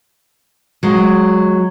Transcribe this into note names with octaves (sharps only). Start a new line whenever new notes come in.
F#3 G#3